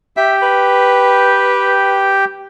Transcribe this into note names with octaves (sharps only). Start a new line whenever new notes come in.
G4 E5 G5
B4